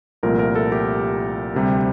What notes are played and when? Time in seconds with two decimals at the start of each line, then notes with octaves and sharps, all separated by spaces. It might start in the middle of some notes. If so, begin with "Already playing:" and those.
0.23 C2 A#2 F3 A3 A#4
0.39 A#4
0.55 A4
0.72 G4
1.55 D2 C3 G3